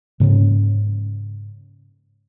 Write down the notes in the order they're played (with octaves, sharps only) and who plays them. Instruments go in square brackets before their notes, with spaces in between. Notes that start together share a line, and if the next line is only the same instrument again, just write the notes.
[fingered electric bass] G#2 C#3 A#3 C#4